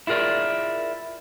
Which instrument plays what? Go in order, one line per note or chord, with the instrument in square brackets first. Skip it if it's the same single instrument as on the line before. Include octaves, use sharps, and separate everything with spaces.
[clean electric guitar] E4 F4 G#4 A#4 D5